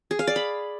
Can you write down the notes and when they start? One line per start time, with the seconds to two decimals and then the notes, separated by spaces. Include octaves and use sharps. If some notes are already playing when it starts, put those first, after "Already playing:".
0.11 G#4
0.19 F5
0.27 D5
0.36 B5